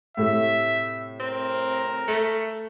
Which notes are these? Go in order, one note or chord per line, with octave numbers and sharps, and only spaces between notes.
A2 C3 A3 E5
C4 A#4
A3 C#7